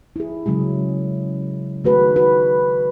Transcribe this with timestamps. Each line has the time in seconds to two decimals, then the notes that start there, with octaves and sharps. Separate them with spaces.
0.16 E4 G#4
0.46 C#3 F#3 G#3 G#4
1.84 D#3 A3 F#4 G#4 B4
2.16 F#4 B4